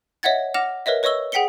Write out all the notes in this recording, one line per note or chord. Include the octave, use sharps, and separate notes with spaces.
C#5 D#5 E5 F#5 G#6 A6
F#5 D6 F6 A#6 E7 F7
A#4 B4 C#5 D#5 E5
B4 C#5 D#5 C#6 E6 G7
G#4 F#5 G5 B6 C#7 G7